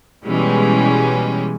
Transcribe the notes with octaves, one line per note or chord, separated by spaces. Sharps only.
B2 E3 G3 G#3 C#4